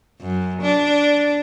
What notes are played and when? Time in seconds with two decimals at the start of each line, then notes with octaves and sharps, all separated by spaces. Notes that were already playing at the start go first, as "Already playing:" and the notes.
0.21 F#2
0.62 D4